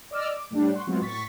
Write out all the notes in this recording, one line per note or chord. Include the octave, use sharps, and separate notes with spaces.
D5 D#5 D6 E6 F6
D6
A2 G3 D4
F#5 C6 C#6
F#3 G#3 B3 C4 F4 F#4
A2 C#6 A6 B6